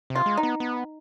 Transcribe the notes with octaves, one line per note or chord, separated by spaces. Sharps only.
C3
F4
G#3
D#4
B3
B3